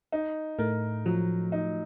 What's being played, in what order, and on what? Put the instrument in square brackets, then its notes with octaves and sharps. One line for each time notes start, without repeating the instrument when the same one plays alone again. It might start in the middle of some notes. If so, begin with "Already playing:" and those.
[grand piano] D#4
[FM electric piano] A2 A3 [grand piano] A#4
[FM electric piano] F3 [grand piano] F#3
[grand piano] D#4